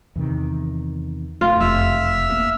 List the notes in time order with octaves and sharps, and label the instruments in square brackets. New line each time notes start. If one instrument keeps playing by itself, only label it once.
[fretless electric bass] E2 C3 D#3
[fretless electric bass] E1 A3 [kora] F4
[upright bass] F1 [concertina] E5 E6 F6
[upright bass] A#3 C#4